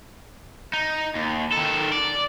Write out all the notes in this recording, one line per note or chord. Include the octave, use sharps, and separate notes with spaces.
D#4
D#2
D#3 A4
D5